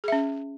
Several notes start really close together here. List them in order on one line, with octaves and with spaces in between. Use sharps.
G#4 E5 C#4